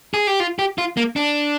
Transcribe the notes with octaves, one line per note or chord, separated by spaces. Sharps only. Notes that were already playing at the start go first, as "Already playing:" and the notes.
G#4
G4
F4
G4
F4
A#3
D4